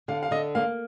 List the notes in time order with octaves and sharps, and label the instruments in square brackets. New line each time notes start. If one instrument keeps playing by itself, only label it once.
[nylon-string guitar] D3 [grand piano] F5
[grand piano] F5
[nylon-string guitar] D3 [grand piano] D#5
[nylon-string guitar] A#3 [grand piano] F5